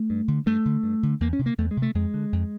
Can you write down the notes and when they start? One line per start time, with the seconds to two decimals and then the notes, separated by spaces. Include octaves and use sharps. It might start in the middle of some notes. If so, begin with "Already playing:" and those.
Already playing: A3
0.10 G2
0.28 D3
0.46 G2 A3
0.65 D3
0.83 G2
1.03 D3
1.20 E2 A#3
1.33 C#4
1.39 C3
1.46 A#3
1.58 E2 A3
1.71 G#3
1.77 C3
1.82 A3
1.95 F2 G#3
2.14 D3
2.33 F2